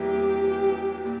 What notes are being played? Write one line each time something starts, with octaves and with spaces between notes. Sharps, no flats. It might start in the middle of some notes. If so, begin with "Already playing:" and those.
Already playing: E2 E3 G3 A#3 E4 G4
A#2